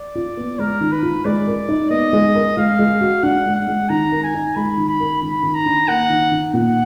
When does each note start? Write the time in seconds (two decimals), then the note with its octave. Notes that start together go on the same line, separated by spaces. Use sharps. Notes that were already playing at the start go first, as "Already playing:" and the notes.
Already playing: D5
0.15 F4
0.37 B3
0.59 G#3 A#4
0.81 D#3
0.92 B4
1.03 F4
1.25 G#3 D5
1.47 A#4
1.69 D#4
1.91 B3 D#5
2.13 G#3
2.35 A#4
2.57 G#3 F5
2.79 G#3
3.01 F#4
3.23 D4 F#5
3.46 G#3
3.56 F#5
3.67 G#3
3.89 D#3 A#5
4.12 A#4
4.23 G#5
4.34 D#4
4.55 G#3 B5
4.77 D#3
4.88 B5
5.00 A#4
5.22 D#3 B5
5.43 D#3
5.54 A#5
5.66 D4
5.88 A#3 F#5
6.10 D#3
6.31 D#3
6.53 A#2 F#5